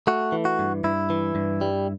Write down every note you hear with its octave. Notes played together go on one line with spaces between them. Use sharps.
A3 F#4
E3
F#4
G2
G2 E4
E3
G2
G3